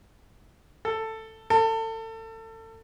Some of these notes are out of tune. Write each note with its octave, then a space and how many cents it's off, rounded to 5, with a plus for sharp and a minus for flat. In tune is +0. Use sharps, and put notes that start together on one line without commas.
A4 +10
A4 +30